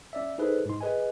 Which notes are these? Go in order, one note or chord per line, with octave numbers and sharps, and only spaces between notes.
C#4 D5 E5
D#4 G#4 A4 B4 C5
G#2 C6
G#4 B4 D#5 G#5